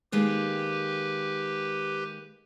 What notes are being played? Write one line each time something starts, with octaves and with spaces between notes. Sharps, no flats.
D#3 G#3 A#3 G4 B4